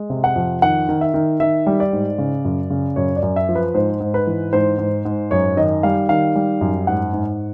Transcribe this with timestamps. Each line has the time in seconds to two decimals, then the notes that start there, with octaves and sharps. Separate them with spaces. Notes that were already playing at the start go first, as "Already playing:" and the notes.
Already playing: G#3
0.10 C3
0.24 F#5
0.36 F2
0.62 D#3 F#5
0.89 D#3
1.01 E5
1.14 D#3
1.40 D#3 E5
1.67 G3
1.80 D5
1.93 G#2
2.18 C#3
2.45 F#2
2.70 C#3
2.96 F#2 C#5
3.16 D5
3.23 F#2
3.36 E5
3.49 F3
3.55 B4
3.74 G#2 C5
4.00 G#2
4.14 B4
4.27 E3
4.53 G#2 C5
4.78 G#2
5.05 G#2
5.31 F#2 C#5
5.57 D#3 D#5
5.83 G3 F5
6.09 D#3 F5
6.35 G3
6.61 F#2
6.87 G#2 F#5
7.13 G#2